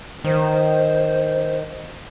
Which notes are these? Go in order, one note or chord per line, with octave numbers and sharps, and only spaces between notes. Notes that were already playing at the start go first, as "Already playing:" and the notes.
D#3 C5